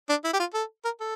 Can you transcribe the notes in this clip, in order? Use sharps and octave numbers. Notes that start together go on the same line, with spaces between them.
D4
E4
G4
F4
A4
A#4
A4